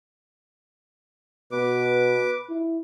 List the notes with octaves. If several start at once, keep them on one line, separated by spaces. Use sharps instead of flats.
B2 B4 D6
E4